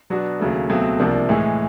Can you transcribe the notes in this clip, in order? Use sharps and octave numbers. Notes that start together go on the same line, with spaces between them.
B2 F#3 B3 D4 F#4
D#2 C#3 F#3 A3
C#2 B2 F#3 A3 C4
C2 C3 F3 A#3 D4
A2 E3 G#3